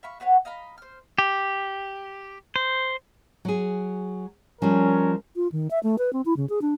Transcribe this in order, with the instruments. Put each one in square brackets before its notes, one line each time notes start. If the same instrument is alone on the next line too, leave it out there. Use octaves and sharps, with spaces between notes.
[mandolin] E5 F5 B5 C#6
F#4 B4 C#5 F#5
D#5 F5 A#5 B5
C5 F6
[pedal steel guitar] G4
C5
[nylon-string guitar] F#3 G#4
[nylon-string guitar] F3 G3 [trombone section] C#4 A#4
[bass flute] F4
D#3
E5
A3
B4
C4
E4
C#3
G#4
D4